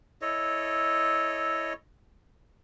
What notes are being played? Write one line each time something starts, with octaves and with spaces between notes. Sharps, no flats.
E4 A4 C#5 D#5